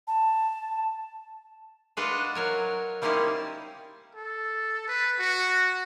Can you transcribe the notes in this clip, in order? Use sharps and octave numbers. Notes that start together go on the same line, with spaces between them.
A5
D4 F4 F#4 B4 D#5 F#5
F#3 A#4 C#5
G3 A#3 C4 C#4 D#4 E4
A4
B4
F#4